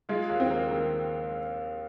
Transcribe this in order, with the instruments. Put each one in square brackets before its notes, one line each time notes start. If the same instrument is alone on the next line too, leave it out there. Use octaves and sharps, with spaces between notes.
[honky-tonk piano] G#3 [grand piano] F4
[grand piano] D#2
[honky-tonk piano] C4
[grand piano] A#3
D#3